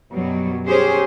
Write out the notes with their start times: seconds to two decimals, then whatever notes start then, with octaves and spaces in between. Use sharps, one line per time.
0.11 F#2 B2 F#3 G3
0.65 C#4 G4 G#4 C5